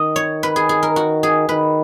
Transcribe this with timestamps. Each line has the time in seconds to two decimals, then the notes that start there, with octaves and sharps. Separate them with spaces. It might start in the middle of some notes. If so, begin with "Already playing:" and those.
Already playing: D#3 D#5
0.16 C#5
0.43 B4
0.56 G#4
0.69 G#4
0.83 A#4
0.96 F#4
1.23 G#4
1.49 D#3 B4